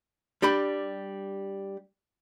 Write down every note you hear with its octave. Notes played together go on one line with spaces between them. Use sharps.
G3 D4 G4 B5